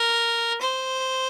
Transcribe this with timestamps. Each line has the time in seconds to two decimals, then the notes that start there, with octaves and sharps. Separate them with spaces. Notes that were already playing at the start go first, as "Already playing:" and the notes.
Already playing: A#4
0.61 C5